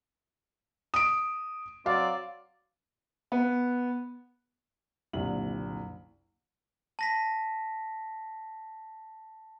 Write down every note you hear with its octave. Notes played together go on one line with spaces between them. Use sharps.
D#6 D7
F#3 C4 D5 F5
B3
F#1 C2 A#2 D3 E5 F#7
A5 A#6 B6